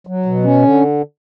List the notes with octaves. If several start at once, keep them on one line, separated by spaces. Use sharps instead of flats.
F#3
B2
C#4
D3